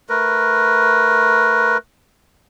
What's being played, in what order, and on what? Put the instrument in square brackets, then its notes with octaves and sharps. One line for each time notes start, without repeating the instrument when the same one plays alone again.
[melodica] A3 A#4 B4